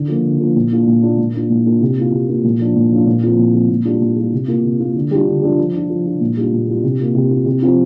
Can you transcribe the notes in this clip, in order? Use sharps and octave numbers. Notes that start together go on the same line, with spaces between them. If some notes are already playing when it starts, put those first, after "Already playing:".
Already playing: D3
F3 A#3
D3
F3 A#3
A#2
A#3 D4 F4
A#2
A#3 D4 F4
A#2
A#3 D4 F4
A#2
A#3 D4 F4
C3
A#3 F4
C3
A#3 F4
A#2
F3 D4 F4
A#2
F3 D4 F4
A#2
F3 C4 F4
A#2
F3 C4 F4
A#2
G3 D4 F4
A#2
G3 D4 F4
C3
A#3 F4
C3
A#3 F4
D3
G3 D4 F4
D3
G3 D4 F4
F3
D4 F4
F3
D4 F4
A#2
G3 D4 F4
A#2
G3 D4 F4
C3
A#3 F4
C3
A#3 F4
C3
F3 C4 F4